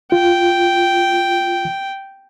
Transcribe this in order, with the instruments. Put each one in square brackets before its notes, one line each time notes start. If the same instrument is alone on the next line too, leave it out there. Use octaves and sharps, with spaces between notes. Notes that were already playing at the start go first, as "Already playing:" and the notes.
[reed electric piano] F4 [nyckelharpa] G5